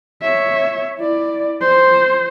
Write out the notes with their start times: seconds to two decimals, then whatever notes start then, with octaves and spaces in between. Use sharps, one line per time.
0.22 C#5 E5
0.99 E4 D5
1.61 C5